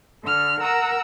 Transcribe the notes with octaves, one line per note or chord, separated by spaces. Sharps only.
D3 A4 F6
A#4 F#5 A#5 E6